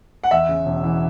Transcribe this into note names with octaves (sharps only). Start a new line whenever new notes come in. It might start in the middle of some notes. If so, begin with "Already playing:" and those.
F#5
E2 E5
C#3
E1
E3